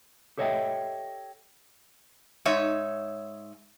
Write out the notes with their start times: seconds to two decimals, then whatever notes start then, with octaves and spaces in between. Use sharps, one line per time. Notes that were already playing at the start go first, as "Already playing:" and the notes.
0.37 G4 A4 C#5 D#5 E5 G5
2.45 G#2 D#4 C#5 E5